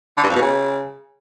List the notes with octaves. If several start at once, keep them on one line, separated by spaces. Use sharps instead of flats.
D3
G2
F2
B2
C#3